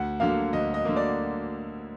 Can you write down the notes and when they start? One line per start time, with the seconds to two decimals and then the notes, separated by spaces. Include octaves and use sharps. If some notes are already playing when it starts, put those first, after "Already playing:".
Already playing: D2 F#5
0.20 D3 F#3 A#3 F5
0.53 D2 D#5
0.74 D#5
0.85 D3 F#3 A#3
0.96 D5